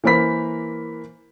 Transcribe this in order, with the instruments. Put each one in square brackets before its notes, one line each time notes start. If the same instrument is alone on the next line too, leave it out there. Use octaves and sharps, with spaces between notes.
[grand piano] E3 A#3 A#4 C5 B5 B6